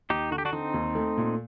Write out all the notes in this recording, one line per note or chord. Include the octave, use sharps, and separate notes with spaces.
D#2 D#4 G4
D3 F#4
G4
D4 F#4
D3 C4 D#4
D#2
A3
A#2